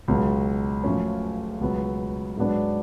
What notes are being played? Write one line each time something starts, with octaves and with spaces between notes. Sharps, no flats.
C#2 B2 F#3
F#2 F3 A3 C#4
C#2 B2 F#3 B3
G#2 F#3 B3 D4